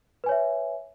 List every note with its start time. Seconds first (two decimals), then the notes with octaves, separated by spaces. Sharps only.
0.24 B4
0.26 G#5
0.29 C#5
0.32 E5